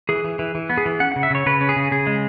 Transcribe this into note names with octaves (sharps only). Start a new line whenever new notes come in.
E3 G#4
E3
E3
E3
B3
G#4
E3
C#4 F#5
C#3 F#5
E5
C#3 C#5
C#3 B4
C#4
G#4
C#3
C#3 G#4
G#3